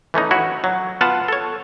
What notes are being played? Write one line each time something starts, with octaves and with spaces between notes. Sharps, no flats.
E3 A3 C#4 D#4
E4 F#4 C#5
F#3
B3 F4 F5 F#5 A5
A4 C#5